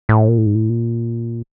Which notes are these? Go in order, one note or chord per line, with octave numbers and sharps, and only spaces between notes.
A2
A#2
A2
G#2
A2
A#2